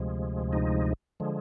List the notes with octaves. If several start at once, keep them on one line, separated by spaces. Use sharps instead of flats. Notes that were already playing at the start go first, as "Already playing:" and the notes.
Already playing: D2 C3 F3 G#3
D#4
D3 F3 G#3